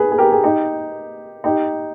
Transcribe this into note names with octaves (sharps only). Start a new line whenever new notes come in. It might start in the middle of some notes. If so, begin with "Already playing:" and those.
Already playing: G#4 B4
G#4
G4 A#4
G#4
D#4 G4
D#4 G4